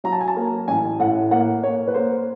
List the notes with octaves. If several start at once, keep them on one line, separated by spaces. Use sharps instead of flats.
F#3 A#5
A5
G#5
A5
A#3
A1 G#5
A2 F#5
A#3 F#5
A#3 C#5
B4
A#3 C5